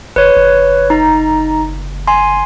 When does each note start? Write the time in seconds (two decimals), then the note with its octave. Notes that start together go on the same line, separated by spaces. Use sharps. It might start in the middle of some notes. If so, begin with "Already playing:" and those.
0.16 F#1 B4 C#5
0.37 F#1
0.90 D#4 A#5
2.07 G#5 C6